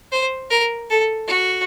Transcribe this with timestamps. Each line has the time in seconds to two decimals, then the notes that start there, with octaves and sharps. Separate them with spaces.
0.12 C5
0.50 A#4
0.90 A4
1.28 F#4